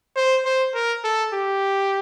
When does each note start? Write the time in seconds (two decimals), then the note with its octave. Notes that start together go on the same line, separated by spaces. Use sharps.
0.16 C5
0.45 C5
0.75 A#4
1.04 A4
1.34 G4